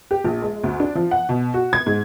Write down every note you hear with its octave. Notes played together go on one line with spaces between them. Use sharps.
G4
A#1
G#3
D2
D4
F3
F#5
B2
F#4
G#6
G#2